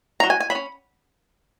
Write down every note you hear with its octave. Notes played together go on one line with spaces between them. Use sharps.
F#3 C#4 A#5
G#5
G#5
F#3 B5
C#4